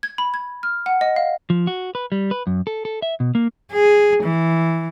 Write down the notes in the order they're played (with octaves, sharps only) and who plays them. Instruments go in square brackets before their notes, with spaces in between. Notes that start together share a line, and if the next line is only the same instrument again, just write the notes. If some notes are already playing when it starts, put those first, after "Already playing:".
[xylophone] G#6
B5
G#6
F6
F#5
D#5
F5
[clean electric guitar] F3
F#4
B4
G3
B4
F#2
A4
A4
E5
B2
A#3
[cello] G#4
E3